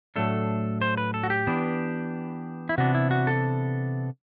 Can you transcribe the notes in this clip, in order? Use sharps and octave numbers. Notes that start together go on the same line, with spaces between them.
A2 F#3 A3 D4 A4
C5
B4
A4
F#4
G4
E3 B3 D4
E4
C3 E3 B3 D4 F#4
E4
F#4
A4